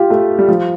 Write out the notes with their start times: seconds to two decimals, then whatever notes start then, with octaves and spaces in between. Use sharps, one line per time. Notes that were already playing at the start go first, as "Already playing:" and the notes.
Already playing: F4 G4
0.10 A3
0.39 G3
0.48 F3